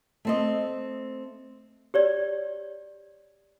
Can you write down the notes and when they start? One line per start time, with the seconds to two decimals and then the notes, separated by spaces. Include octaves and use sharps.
0.25 A3 C4 D#5
1.94 G4 C#5 D5